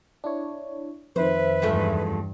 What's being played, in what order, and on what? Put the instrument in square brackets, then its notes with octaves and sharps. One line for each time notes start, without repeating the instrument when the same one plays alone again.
[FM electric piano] D4 E4 C#5
[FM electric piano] F2 D#3 [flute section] B4 E5 [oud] C5
[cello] E2 G2 [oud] F3 G#3 A3